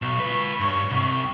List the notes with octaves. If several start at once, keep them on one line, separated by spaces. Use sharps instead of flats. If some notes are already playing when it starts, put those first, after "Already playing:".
B1 C#6
F4 B4
G2 C#6
C2 C3